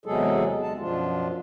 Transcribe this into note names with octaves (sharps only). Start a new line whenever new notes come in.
E2 C3 F#3 G#3 G#4 A4
D3 G#3 A5
F#2 B2 F3 D4 F4